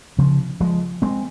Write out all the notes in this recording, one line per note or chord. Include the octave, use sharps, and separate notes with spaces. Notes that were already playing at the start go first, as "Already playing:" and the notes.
C#3 F3
F3 G#3
G#3 C4